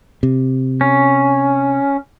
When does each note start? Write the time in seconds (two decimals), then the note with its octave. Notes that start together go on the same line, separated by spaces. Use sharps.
0.23 C3
0.81 C#4